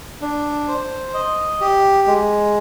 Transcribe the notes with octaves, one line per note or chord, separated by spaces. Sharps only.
D4
C5
D#5
G4
G#3